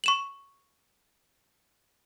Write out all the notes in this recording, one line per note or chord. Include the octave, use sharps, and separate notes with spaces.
C#6 E7 F#7